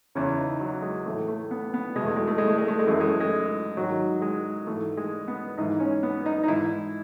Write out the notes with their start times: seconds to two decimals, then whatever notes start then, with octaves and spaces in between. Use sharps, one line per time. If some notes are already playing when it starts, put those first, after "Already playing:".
0.15 E2 C#3 E3 C#4
0.38 D#4
0.60 F#3
0.82 G#3
1.05 A2 E3 A3
1.28 A3
1.51 B3
1.74 B3
1.96 E2 B2 G#3
2.06 A3
2.16 G#3
2.27 A3
2.38 G#3
2.47 A3
2.58 G#3
2.68 A3
2.79 G#3
2.87 F#2 E3 A3
3.00 G#3
3.10 A3
3.20 G#3
3.77 G#2 D#3 F#3
4.22 G#3
4.67 G#2 E3 A3
4.97 G#3
5.28 B3
5.57 G#2 E3 D#4
5.80 C#4
6.03 B3
6.26 D#4
6.43 D#4
6.48 G#2 E3 E4